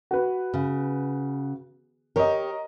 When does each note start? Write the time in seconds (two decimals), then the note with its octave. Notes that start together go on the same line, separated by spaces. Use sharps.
0.11 F#4 B4
0.54 C#3
2.16 G4 A#4 C#5 D#5